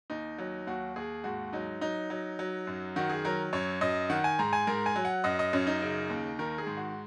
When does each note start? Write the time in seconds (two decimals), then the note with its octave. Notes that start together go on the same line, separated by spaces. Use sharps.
0.10 D#2 D#4
0.39 F#3
0.67 D#2 F#4
0.96 D#2 G#4
1.24 G#2 F#4
1.53 F#3 D#4
1.81 F#3 D#4
2.10 F#3
2.39 F#3
2.67 F#2
2.96 D#3 F#4
3.10 G#4
3.25 F#3 A#4
3.53 F#2 C#5
3.81 F#2 D#5
4.10 D#3 F#5
4.24 G#5
4.39 G#2 A#5
4.53 G#5
4.67 G#2 A#4
4.86 G#5
4.96 F#3
5.05 F#5
5.24 F#2 D#5
5.39 D#5
5.53 F#2 C#4
5.67 D#4
5.82 C#3
6.10 D#2
6.39 D#3 A#4
6.58 G#4
6.67 G#2
6.77 F#4